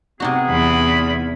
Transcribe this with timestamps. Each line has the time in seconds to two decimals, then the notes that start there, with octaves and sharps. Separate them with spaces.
0.20 C3 B3 D#4 F#4 G#4
0.50 E2 B5